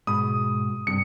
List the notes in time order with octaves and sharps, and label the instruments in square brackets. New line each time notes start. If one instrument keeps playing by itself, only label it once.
[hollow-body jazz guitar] G#2 B2 B5 [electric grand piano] D#6
[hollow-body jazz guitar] G2 C3 [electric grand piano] C#7